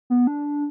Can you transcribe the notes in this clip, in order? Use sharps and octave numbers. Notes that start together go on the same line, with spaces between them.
B3
D4